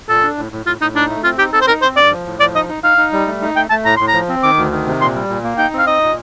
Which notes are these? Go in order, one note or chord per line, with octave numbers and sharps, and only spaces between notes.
A#2 A4
D4
A2
A2
A2 F4
A2 D#4
D4 D#4
A3
C4 F4
D#4 G4
C4 A4
C5
D#4 A#4
C4 C5
G2 D5
F3
A2
F3 D5
D#4 D#5
D#4
D#4 F5
D#4
G3
A3
D#4
A3 G5
A3 A5
A2 A#5
A2 C6
A#5
F3
C4
D#3 D6
D2
D#3
C3
A#2 C6
G3
A#2
A#3
D#4 G5
C4
F5
D#4 D#5
A#2